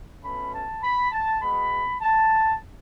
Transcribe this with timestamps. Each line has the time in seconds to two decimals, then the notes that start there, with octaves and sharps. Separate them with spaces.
0.23 B2 A3 C#4 B5
0.52 A5
0.82 B5
1.11 A5
1.41 B2 G#3 B3 B5
2.01 A5